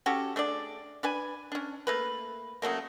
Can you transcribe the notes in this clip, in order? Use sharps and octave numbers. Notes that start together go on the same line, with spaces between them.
C#4 F#4 G4 A4
A3 D4 G#4 D5
D4 B4 G#5
C#4 D4
A3 A#3 B4
C#3 F#3 A3 A#3